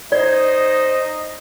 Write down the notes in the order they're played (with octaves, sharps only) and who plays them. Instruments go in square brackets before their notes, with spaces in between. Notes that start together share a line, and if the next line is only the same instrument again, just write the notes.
[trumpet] D#4 [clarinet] C5 [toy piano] D5 [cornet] D#5